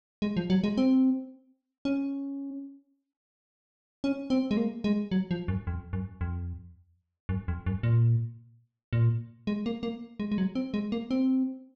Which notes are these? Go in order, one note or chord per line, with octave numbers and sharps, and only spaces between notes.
G#3
F3
F#3
G#3
C4
C#4
C#4
C4
G#3
A#3
G#3
F#3
F3
F#2
F2
F#2
F2
F#2
F2
F#2
A#2
A#2
G#3
A#3
A#3
G#3
G#3
F#3
C4
G#3
A#3
C4